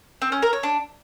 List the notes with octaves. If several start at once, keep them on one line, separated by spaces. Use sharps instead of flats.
C4
C#4
A#4
C#5
D4